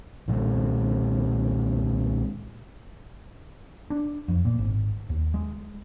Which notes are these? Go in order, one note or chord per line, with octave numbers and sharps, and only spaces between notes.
B1 A#2 G3 G#3
D4
F2
A#2
G#1
D#2
G#3